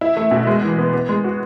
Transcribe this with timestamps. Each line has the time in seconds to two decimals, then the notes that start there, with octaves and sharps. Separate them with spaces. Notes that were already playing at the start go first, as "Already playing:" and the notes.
0.01 E4
0.17 A3
0.31 B2
0.47 G#3
0.63 E3
0.78 B3
0.94 B3
1.09 G#3
1.24 F#4